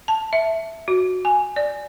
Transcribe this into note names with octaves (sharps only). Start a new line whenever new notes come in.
A5
E5
F#4
G#5
D5